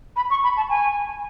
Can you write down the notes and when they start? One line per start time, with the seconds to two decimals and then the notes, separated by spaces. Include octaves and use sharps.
0.16 B5
0.30 C#6
0.44 B5
0.57 A5
0.69 G#5